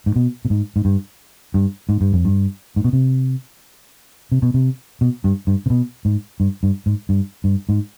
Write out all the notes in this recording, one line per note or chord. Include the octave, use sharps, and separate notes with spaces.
G#2
B2
B2
G#2
G#2
G2
G2
G#2
G2
F2
G2
G#2
B2
C3
C3
B2
C3
B2
G2
G2
C3
B2
G#2
G2
G2
G#2
G2
G2
G#2